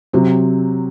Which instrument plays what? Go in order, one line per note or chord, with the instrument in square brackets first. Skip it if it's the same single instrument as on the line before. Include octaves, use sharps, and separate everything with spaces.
[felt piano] C3 F#3 C4